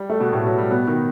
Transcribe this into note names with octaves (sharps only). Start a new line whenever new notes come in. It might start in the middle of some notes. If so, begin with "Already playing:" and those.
Already playing: G3
A3
B2 B3
A2 A3
F#3
G3
B2 B3
D#3 D#4